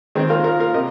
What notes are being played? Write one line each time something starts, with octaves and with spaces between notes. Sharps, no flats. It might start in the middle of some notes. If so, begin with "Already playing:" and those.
D#3 G#3 C4
F4 A#4
F4 A#4
F4 A#4
C3 A#4 D#5